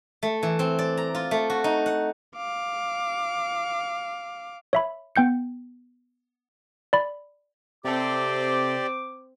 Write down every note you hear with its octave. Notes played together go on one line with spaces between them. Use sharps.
A3
E3
C4
D5
A#5
F4
A3
F#4
D#4
F#5
F5 D6
C#5 E5 B5
B3 G5 G6 C#7
D5 B5
C3 C4 G4 A4 C5 D5 D6